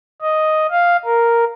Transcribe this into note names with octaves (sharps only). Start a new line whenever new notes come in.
D#5
F5
A#4